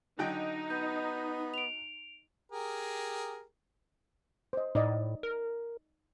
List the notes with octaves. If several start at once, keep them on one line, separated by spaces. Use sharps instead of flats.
D3 F#3 D#4 G5
B3 G6
D7 F7
G4 G#4 A#4
C5 D#5
A2 D#4 D5 D#5
A#4